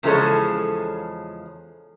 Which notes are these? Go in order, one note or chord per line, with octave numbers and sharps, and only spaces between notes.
E2 C#3 F3 G#3 A4 C#5